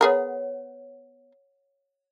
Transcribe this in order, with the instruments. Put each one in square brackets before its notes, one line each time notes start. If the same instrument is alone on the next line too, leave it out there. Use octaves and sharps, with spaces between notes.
[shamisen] B3 G#4 A#4 [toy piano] C#5 F#5